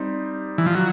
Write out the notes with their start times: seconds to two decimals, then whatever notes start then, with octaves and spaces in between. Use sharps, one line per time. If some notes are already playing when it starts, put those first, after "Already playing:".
Already playing: G3 C4 D#4
0.58 E3
0.66 F3
0.75 F#3